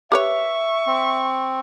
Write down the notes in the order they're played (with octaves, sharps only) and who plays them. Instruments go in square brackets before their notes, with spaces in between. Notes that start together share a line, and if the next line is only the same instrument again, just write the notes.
[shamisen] G4 B4 C#5 [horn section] E5 [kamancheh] C#6
[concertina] C4